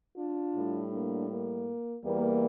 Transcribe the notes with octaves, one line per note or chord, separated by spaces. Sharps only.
D4 F4
A2 G3
A#3 D4
A#3
E2 E3 G3 A#3